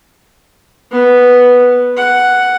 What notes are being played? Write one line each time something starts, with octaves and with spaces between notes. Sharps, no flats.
B3
F#5